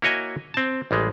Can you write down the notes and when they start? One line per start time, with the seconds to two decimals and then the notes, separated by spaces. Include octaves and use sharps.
0.02 A#3 E4 F#4 C#5 D#5 G#5
0.54 C4 A5
0.91 A1 G3 G#3